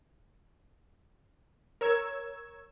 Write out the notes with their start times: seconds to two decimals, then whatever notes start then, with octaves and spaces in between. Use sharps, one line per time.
1.81 A#4 C#5 E6 G#6